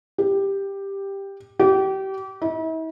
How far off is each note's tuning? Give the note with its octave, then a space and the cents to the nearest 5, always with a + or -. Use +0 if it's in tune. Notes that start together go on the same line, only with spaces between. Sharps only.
G4 +5
G4 -30
E4 -45